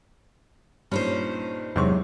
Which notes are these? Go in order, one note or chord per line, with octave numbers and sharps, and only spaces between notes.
G2 A#2 C#4 D#4 C5
E2 G#2 C3 F#3 C6 C#6